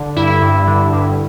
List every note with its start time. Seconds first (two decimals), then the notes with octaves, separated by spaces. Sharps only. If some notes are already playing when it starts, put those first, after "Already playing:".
Already playing: D3
0.16 G2 E4
0.42 G2
0.67 D3
0.93 G2